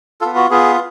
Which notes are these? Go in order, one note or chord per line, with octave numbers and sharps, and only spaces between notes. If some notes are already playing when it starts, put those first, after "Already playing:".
B3 F4 A4
F#4
B3 F4 G#4